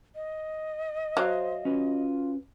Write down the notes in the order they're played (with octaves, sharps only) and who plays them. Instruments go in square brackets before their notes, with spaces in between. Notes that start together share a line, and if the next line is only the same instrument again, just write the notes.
[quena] D#5
[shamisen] F#3 [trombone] C5 [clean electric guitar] E5 F5
[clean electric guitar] C#4 F#4 B4 [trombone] F4